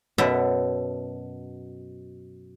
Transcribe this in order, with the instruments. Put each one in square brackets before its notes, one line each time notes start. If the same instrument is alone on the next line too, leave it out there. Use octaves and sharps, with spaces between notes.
[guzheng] F#2 B2 A4 E5 F#5 B5